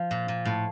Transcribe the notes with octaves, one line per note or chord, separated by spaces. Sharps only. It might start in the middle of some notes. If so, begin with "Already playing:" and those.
Already playing: F3
A#2
A#2
A2